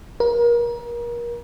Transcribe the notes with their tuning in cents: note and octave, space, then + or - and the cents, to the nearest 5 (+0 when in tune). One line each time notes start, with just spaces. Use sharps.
A#4 +30